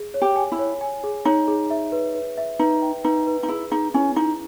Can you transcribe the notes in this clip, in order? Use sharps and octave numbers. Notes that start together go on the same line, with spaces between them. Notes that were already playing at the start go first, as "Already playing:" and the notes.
Already playing: G#4
C#5
G4
G#5
E4
C#5
G#5
G#4
D#4 C#5
G#4
E5
B4
B4
E5
D#4 B4
G5
D#4 B4
B4
D#4
E4 G#4
D#4 G#4
C#4 E4
D#4 E4